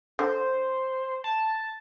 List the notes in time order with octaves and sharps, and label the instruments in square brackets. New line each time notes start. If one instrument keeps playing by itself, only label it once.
[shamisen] D3 [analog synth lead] C5
[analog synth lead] A5